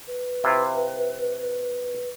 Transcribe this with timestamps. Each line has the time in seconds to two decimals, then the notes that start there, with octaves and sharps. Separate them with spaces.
0.08 B4
0.44 C3 E4 F4